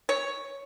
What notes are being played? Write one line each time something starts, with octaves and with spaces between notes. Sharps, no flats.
C#5